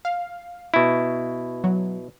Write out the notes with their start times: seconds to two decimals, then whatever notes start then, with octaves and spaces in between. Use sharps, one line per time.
0.05 F5
0.74 B2 E4
1.64 F#3